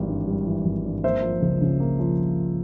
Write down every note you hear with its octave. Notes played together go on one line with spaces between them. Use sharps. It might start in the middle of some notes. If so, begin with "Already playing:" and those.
Already playing: G#1 E3 G3
G2
G3
E3
G#1
G2
A#3 C5 E5
F3
C#2
C#3
A#3
F3